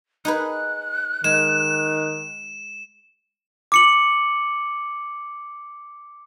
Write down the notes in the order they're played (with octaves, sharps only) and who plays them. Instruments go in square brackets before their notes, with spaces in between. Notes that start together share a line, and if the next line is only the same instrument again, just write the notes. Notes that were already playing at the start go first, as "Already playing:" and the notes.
[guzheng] D#4 G#4 B4 [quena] F#6
[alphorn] D#3 [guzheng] G#3 [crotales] E7
[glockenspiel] D6 C#7 F#7